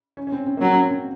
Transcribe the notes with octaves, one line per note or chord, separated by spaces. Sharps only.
C#4
C#4
C4
C4
A#3
F#3 C4
C#4
C4
C4